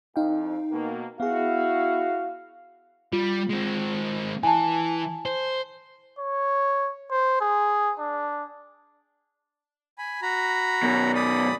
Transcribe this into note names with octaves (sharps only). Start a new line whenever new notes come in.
C2 F2 F3 D#4 F5 G5
B2 A#3
B3 E4 F#4 G#4 F5
G3 F4
G#3 C4
E3 G#5 A5
C5
C#5
C5
G#4
D4
G#5 B5
F#4 A#5 B5
F#2 B2
D5 B5 D#6